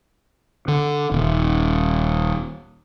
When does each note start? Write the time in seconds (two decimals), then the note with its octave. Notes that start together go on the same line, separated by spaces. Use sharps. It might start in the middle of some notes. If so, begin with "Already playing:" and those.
0.68 D3
1.12 D#1